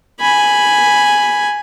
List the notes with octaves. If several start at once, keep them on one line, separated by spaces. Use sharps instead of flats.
G#5 B5